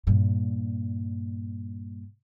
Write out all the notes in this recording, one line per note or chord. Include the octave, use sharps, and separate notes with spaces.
G2 A#2